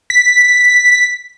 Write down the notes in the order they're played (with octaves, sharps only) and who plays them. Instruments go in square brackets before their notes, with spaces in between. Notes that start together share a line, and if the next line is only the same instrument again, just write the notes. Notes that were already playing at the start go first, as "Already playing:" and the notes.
[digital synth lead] B6